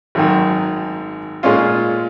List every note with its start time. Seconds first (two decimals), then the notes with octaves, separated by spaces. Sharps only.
0.15 G#1 F#2 D#3
1.43 A#2 G#3 C#4 F4